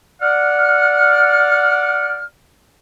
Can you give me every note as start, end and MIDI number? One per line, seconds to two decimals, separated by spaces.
0.21 2.23 74
0.21 2.23 78
0.21 2.23 89